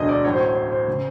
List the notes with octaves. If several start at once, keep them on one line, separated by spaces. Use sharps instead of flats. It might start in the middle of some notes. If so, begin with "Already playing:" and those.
Already playing: E1 D2 D3 F#3 D#5
D5
A1 A2 F#3 C#5
C5
C#5
C5
C5
C#3